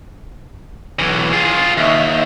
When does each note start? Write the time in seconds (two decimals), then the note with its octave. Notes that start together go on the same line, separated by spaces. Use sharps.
0.99 B1 E3
1.33 F4 G#4
1.77 D#2 D#5 E5